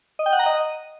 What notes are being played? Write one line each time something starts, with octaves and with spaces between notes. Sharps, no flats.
D#5
G5
F#5
A#5
D#5